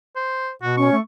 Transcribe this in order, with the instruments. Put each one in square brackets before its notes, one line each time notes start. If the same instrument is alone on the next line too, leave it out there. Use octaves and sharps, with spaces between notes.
[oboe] C5
[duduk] B2 [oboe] F#4
[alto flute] C#4 [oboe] C#6
[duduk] A3